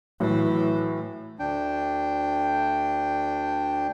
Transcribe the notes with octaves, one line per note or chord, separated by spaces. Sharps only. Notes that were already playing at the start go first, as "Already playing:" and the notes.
A2 E3 F#3
D2 D4 G5